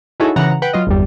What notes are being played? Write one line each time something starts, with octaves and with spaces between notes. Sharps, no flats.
D#4 E4 F#4 G#4 A4 C#5
C#3 E3 F#5 A#5
B4 F#5 G5
F#3 F4 D#5
G1 E2 G3